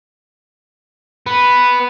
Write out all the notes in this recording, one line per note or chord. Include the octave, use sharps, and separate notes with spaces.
B3